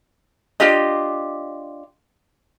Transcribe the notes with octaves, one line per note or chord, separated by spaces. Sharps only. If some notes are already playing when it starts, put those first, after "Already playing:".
D4 F4 G4 D#5